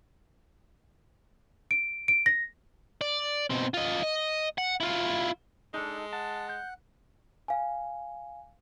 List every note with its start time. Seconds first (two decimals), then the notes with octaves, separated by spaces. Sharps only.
1.71 D7
2.08 D7
2.26 A#6
3.01 D5
3.50 B2 C4
3.74 F4 D#5
4.03 D#5
4.58 F#5
4.80 E4 F4
5.74 G#3 D4 D#4 A4
6.13 F#5 A5
6.49 G6
7.48 F5 G#5